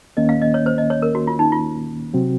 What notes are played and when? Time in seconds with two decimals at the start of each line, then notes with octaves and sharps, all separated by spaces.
0.17 D#2 D#3 A#3 C#4 D#5
0.29 F5
0.42 D#5
0.54 C#5
0.66 C5
0.78 D#5
0.90 C#5
1.02 A#4
1.15 F#4
1.27 F4
1.39 D#4
1.52 F4
2.13 C3 F#3 C4 F#4